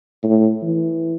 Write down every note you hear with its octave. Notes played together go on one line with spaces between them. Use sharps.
A2
E3